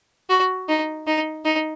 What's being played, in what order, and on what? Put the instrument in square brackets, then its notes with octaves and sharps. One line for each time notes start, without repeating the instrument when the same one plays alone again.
[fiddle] F#4
D#4
D#4
D#4